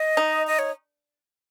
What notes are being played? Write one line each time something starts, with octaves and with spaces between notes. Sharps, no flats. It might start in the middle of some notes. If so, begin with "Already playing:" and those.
Already playing: D#5
D#4
D#5
C#5